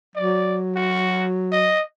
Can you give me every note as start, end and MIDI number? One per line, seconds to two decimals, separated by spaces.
0.16 1.75 54
0.16 0.58 74
0.75 1.26 66
1.52 1.81 75